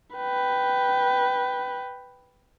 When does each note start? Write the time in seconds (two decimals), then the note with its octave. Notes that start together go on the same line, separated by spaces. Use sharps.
0.16 B4 G5